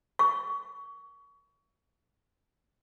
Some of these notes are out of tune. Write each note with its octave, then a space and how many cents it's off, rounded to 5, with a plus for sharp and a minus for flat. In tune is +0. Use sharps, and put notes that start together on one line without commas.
C#6 +25